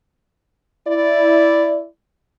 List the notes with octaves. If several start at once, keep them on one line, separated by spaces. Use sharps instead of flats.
E4 D5